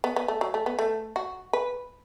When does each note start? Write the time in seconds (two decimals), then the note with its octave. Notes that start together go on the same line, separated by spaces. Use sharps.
0.04 B3
0.16 B3
0.28 A3
0.41 F#3
0.54 A3
0.66 B3
0.79 A3
1.16 F#4
1.53 B4